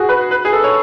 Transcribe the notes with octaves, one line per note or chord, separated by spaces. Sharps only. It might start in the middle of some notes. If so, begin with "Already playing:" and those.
Already playing: F#4 G#4
B4
B4
G#4
A4
C#5